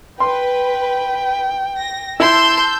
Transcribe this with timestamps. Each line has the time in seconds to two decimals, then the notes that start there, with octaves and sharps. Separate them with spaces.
0.20 B4 G5 C6
1.78 A#6
2.20 E4 A5 C6 E6 G6